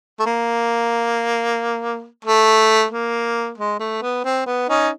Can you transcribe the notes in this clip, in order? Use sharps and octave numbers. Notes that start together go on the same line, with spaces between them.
A3
A#3
A3
A#3
G#3
A3
B3
C4
B3
C#4 D#4